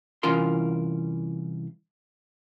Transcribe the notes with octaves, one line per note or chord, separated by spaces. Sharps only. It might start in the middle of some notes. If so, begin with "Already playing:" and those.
C2 E3 C#4 F4 A#4 C6